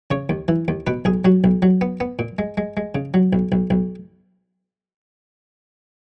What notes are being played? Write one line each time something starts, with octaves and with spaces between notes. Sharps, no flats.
C#3 C#5
D#2
E3
D#2
B2 B4
B1 G#4
F#3 F#4
B1
F#3
B3
B3
A#2
G#3
G#3
G#3
C#3
F#3
B1
B1
B1